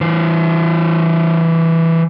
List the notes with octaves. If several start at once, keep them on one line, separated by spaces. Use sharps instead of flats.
E3 C5